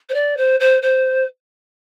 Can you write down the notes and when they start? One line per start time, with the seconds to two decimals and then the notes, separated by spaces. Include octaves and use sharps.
0.09 C5
0.14 D5
0.37 C5
0.60 C5
0.82 C5